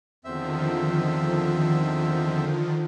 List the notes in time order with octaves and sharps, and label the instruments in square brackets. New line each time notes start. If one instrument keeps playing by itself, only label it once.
[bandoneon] E2 C4 E5 [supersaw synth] D3 D#3 F3